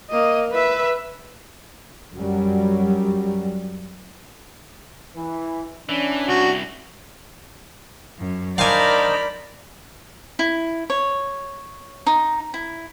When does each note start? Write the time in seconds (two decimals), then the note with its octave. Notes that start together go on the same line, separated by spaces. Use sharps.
0.10 A#3 D#5
0.51 B4 E5
2.17 F#2 F#3 G3
5.16 E3
5.89 E3 C#4 D4
6.29 C2 F#4
8.18 F#2
8.58 D4 D#4 A#4 C5 D5 F5 G#5 B5
10.39 E4
10.90 C#5
12.06 D#4
12.54 E4